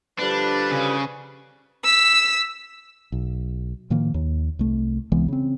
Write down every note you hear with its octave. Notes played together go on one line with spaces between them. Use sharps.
D3 F3 G3 D4 B4
C#3
E6 B6
B1
A2 D#3 F3 A#3
D#2
C2 A3
C2 E3 G#3 B3
C#3 C4